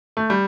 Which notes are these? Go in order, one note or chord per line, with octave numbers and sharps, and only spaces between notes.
A3
G3